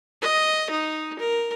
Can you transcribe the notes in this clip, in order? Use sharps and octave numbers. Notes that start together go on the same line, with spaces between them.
D#5
D#4
A#4